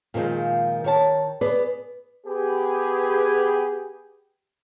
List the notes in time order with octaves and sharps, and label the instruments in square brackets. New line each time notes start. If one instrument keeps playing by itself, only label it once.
[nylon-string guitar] A#2 D#3 F3 G#3
D#3 C#5 A5
B3 G#4 B4 D5
[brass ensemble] B3 G4 G#4 B4